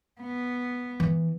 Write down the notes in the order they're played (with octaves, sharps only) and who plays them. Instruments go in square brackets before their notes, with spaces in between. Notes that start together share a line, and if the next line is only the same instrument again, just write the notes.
[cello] B3
[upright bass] E3